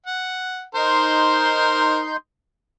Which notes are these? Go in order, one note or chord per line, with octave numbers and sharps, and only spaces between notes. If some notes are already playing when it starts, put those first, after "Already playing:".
F#5
D#4 A#4 C5 C6 G6